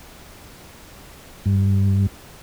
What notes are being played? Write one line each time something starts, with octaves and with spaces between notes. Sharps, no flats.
G2